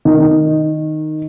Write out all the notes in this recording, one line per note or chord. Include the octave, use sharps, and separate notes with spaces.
D#3